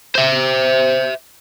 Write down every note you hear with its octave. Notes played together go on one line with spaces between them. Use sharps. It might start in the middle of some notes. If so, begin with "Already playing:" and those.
C5 E5